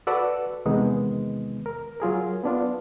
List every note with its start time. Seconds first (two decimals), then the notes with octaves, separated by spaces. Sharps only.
0.07 F#4 A4 B4 D5 F#5 E6
0.66 E2 C3 D#3 G#3 B3 D#4
1.66 A#4
2.00 F#3 F4 G#4 A#4
2.44 B3 D4 F4